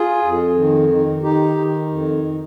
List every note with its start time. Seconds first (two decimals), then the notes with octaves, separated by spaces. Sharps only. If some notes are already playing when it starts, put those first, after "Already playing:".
Already playing: F4 G#4
0.23 F2
0.56 D#3
0.89 D#3
1.23 D#3 D#4 G4
1.56 D#3
1.90 F2